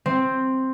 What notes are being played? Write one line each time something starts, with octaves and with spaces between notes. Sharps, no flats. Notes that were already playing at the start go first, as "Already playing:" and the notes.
C4